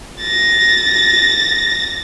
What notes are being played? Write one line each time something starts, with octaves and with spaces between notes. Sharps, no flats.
A6 A#6